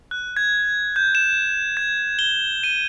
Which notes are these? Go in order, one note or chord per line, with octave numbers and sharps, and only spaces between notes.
F#6
G#6
G6
E7
G#6
G7
D#7